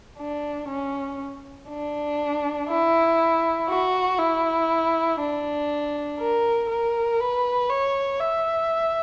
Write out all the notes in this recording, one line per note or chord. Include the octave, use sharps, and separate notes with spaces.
D4
C#4
D4
E4
F#4
E4
D4
A#4
A#4
B4
C#5
E5